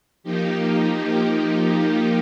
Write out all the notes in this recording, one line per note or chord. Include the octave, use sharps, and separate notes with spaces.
F3 A#3 D#4 G4